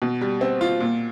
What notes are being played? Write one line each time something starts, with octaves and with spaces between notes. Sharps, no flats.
B2
G3
C4
F4
A#2